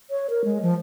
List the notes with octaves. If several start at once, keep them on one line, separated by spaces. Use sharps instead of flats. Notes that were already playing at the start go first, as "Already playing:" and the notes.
C#5
A#4
G#3
F3